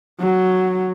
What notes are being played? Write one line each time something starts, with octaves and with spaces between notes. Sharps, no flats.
F#3